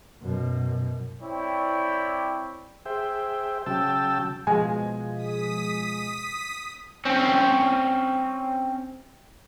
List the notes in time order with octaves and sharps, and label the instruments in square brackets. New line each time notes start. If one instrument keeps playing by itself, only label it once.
[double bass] F#2 B2
[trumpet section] C4 E4 C#5 D5 G5
[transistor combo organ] G#4 C5 E5 G5
C#3 F#3 G5 A5 E6
[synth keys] B2 F3 G#3 [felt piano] G#5
[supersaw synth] D#6 B6
[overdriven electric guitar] C4 C#4